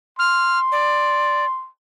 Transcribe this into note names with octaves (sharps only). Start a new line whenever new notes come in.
C6 F6
D5